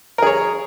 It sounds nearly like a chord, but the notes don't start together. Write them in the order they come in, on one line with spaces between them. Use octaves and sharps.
A#4 G#4 C#5